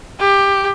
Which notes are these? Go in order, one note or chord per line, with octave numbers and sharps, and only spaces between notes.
G4